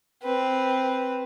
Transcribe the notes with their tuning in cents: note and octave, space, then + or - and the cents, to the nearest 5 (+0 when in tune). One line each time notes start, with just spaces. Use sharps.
C4 +0 B4 +0